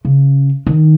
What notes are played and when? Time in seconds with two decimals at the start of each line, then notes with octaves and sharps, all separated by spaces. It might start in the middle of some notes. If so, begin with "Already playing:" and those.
0.05 C#3
0.67 D#3